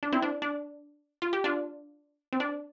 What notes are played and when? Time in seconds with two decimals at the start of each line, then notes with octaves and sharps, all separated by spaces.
0.03 D4
0.12 C4 E4
0.22 D4
0.42 D4
1.22 F4
1.33 G4
1.44 D4 F4
2.33 C4
2.40 D4